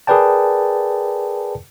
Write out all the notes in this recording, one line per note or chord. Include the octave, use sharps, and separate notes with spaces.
G#4 A#4 B4 D5 G5 A5